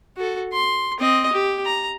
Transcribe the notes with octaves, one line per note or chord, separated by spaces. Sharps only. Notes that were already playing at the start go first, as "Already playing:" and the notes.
F#4 A4
C6
C4 D#5
G4
A#5